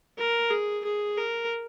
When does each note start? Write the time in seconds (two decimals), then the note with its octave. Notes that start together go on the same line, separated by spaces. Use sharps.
0.18 A#4
0.50 G#4
0.84 G#4
1.17 A#4